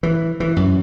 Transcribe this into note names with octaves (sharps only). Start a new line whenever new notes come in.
E3
E3
F#2